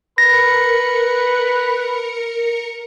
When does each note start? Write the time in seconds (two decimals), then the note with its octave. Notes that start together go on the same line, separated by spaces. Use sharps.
0.18 A#4 B4 B5 A#6 C#7